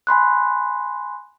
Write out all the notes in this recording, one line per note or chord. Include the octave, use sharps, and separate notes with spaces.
G#5 B5 C6 F#6